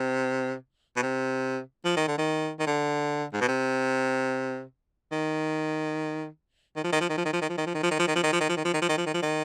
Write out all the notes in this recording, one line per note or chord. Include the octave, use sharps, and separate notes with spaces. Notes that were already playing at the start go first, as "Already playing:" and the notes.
Already playing: C3
B2
C3
F3
D#3
D3
D#3
D#3
D3
G#2
B2
C3
D#3
D#3
F3
D#3
F3
D#3
F3
D#3
F3
D#3
F3
D#3
F3
D#3
F3
D#3
F3
D#3
F3
D#3
F3
D#3
F3
D#3
F3
D#3
F3
D#3
F3
D#3
F3
D#3